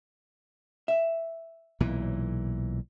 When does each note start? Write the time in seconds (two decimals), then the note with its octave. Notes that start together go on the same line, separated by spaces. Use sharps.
0.88 E5
1.80 B1 A#2 E3